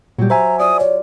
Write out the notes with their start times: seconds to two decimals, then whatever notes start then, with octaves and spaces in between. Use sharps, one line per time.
0.18 A#2 F#3 G3 G4
0.30 C5 E5 G#5 A#5
0.59 F4 D5 D#6
0.80 C#5